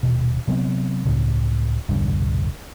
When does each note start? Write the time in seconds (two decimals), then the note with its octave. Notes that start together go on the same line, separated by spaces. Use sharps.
0.03 D#1 B2
0.48 C3 F#3 B3 C4
1.05 C#2 A2 C#3
1.89 E1 C2 G2 D3